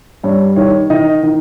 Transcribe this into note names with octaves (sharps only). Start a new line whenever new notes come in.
G2 C#5
D#3 C#5
D#3 D#5
D#3